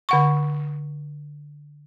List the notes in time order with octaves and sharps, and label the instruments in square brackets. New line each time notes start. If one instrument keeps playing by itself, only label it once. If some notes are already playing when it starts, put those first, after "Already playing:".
[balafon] D3 F#5 C#6